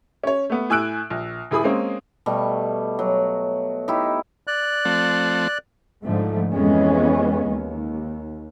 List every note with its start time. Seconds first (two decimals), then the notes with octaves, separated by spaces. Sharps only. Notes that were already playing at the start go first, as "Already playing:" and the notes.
0.24 C#4 C#5
0.50 A3 B3
0.70 A2 G#5 E6 F#6 D7
1.10 A#1
1.51 D#1 E4 G#4 B5 D#6
1.64 G#3 A#3 C4 C#4
2.26 B2 G3 A3 C#6
2.99 F#3
3.88 D#4 E4 G4
4.47 D5 F#6
4.85 F3 A3 C4
6.03 G#2 D3 F3 A3
6.52 F2 E3 G#3 B3 C#4
7.46 D#2